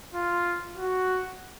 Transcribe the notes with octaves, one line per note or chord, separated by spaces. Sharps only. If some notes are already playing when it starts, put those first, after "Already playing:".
F4
F#4